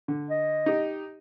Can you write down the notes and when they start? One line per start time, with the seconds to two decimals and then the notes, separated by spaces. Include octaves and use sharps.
0.08 D3
0.30 D#5
0.66 D#4 G4